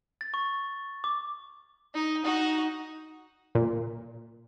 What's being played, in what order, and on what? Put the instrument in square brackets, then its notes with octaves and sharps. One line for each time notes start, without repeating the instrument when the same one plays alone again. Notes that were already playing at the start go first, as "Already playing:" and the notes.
[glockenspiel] A6
C#6
D6
[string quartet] D#4
D#4 F#4
[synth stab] A#2